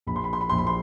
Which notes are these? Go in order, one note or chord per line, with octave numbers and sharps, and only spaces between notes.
A#1 B5
C6
B5
C6
B5
A#1 C6
B5
C6